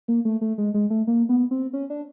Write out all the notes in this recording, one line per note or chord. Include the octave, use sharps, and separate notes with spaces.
A#3
A3
A3
G#3
G#3
A3
A#3
B3
C4
C#4
D4